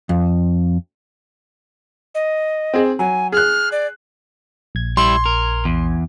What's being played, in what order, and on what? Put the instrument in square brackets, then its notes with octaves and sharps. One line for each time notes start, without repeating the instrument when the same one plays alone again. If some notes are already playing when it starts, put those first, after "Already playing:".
[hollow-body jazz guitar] F2
[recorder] D#5
[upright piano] C4 G#4
[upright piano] F#3 [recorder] G#5
[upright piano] G#4 F#6 [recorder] F6
[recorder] D5
[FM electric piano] A#1 G#6
[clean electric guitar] G3 E4 [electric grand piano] C6
[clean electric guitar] A#4
E2